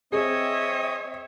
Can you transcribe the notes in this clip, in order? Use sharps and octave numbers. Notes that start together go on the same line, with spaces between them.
C4 G#4 C#5 D#5 E5